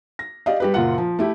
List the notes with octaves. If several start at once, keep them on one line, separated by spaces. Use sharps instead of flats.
A#6
G4 D5 D#5 F5
G3 G4 B4
F#1 A#2 F4 F#5
F3
A3 E4 G4